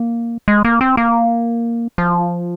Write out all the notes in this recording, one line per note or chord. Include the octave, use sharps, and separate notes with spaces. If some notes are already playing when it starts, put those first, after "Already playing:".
Already playing: A#3
G#3
A#3
C4
A#3
F3